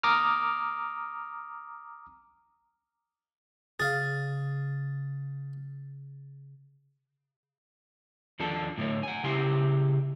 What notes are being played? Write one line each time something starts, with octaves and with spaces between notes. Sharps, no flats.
A#5 D6 D#6 F6
C#3 G#4 F5 A6
D#2 F3 D4 A4 A5
A2 D3 A3 C#5
F#5 G#5
C#3 E4 G4 E5 C6